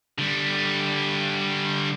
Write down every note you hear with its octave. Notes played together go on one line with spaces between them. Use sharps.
D3 G3